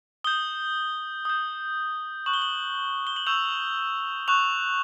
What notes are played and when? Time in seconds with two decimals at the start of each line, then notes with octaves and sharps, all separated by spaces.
0.24 D#6 G6 G7
1.25 D#6 G6
2.26 C#6 F#6 F#7
2.34 G7
2.42 F#7
3.07 G7
3.16 F#7
3.26 C#6 E6 G6 F7
4.28 C#6 F#6 F7